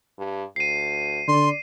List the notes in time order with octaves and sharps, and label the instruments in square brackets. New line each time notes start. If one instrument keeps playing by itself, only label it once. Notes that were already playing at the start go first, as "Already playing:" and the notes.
[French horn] G2
[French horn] D2 [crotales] C7 D#7
[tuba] D3 [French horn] D5 [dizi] C6